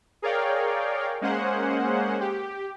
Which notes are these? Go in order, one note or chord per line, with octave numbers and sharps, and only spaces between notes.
G#4 A#4 C#5 D5 F5 G5
G#3 A#3 C#4 G#4 C5 F#5
G4